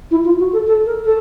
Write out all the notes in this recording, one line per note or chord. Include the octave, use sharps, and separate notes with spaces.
E4
F4
F#4
A4
A4
A#4
A4